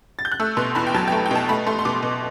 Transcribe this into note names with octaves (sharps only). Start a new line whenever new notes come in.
A6
G6
F#6
A3 E6
B2 C6
E2 B5
G5
F#3 A5
G5
A3
G5
B2 A5
A3 B5
A3 C6
C6
B2 D6
B2